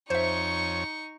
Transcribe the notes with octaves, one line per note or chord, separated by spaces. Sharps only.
F2 D#4 C5 C#5 E5 C#6